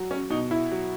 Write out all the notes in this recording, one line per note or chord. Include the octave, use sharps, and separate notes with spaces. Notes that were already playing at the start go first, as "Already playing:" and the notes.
Already playing: F#3
C#4
B2 D#4
E4
F#3